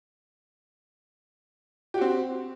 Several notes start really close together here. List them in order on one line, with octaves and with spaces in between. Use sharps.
G4 F#4 C4